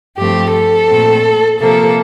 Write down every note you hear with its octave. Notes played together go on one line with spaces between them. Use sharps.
G2 F3 A3 C4 G4
A4
A#2 A3 C4
C3 F3 A#3 A4